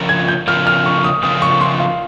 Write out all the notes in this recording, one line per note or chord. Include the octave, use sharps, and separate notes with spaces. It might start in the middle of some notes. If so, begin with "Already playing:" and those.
Already playing: C#3 F3 F4 A#4
G#6
G6
C#3 F3 C4 F4 A#4 F6
F6
C#6
D#6
C#3 F3 C4 F4 A#4 D#6
C#6
C6
F5